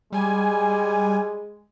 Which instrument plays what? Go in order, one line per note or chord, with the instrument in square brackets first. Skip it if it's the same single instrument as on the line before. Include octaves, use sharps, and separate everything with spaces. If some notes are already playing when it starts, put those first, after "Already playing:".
[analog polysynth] G3 G#5 [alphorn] G#3